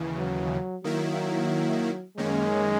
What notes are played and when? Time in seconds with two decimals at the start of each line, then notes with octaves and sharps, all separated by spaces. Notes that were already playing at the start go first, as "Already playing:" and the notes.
Already playing: D#2 C#3 E3
0.17 F#3
0.84 D#3 F#3 A#3 E4
2.17 F#2 D#3 G#3 A#3 C#4